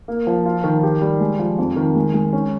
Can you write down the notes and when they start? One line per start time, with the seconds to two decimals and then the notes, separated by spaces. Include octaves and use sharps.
0.08 A#3
0.27 F3
0.45 F4
0.64 D#3
0.83 G4
1.02 G3
1.20 G#3
1.39 F3
1.59 F2
1.76 D#3
1.95 G#3
2.14 G#3
2.33 C#4